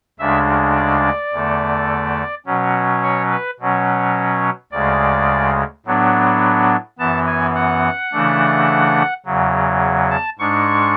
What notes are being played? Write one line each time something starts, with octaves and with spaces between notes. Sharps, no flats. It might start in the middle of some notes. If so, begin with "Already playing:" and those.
D2 C#3 G#3 D4 E5
D5
E2 D3 A3
B2 F#3 C#4
C#5
B4
B2 F#3 C#4
D2 C#3 G#3 D5
A2 F#3 B3 D4
F#2 E3 B3 A5
G#5
F#5
C#3 E3 A3 D4
E2 C#3 F#3
A5
G#2 G#3 D4 C#6